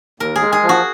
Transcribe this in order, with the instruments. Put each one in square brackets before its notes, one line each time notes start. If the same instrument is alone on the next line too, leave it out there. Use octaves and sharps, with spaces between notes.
[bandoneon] D#2 [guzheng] A#4
[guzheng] G#4
[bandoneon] G#3
[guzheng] G#4
[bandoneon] F3
[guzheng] F#4